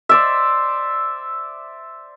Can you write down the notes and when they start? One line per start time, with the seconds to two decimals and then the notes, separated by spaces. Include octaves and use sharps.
0.09 C5 D5 E5